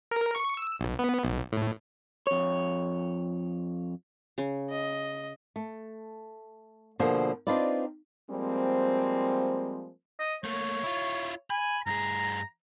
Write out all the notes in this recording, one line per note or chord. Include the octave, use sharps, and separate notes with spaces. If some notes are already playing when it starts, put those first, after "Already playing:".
A#4
C#6
E6
B1
B3
B1
A2
F2 C#5
C#3
D#5
A3
B2 D3 F3 A#3 G#4 C5
C4 D4 D#4 F4 B4 D5
F3 G3 G#3 A#3 C4
D#5
A3 A#3 C#5
E4 F4
G#5 B5
G2 G#4 A#5